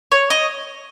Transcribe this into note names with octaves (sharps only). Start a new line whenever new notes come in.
C#5
D#5